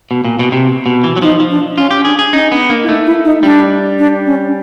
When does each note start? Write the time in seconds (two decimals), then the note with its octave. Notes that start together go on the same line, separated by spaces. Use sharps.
0.11 B2
0.25 A#2
0.39 B2
0.52 C3
0.86 B2
1.04 E3
1.16 F#3
1.22 F3 D#4
1.40 F3
1.50 D4
1.77 C#4 F4
1.91 G4
2.05 D4 G#4
2.19 G#4
2.33 C#4 D#4
2.51 B3 D4
2.69 A#3 D4
2.83 E4
2.88 A3 D#4
3.06 E4
3.25 D#4
3.43 G3 D4
3.99 D4
4.26 C#4